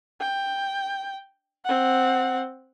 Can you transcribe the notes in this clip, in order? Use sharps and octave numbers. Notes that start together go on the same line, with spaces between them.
G5
C4 F#5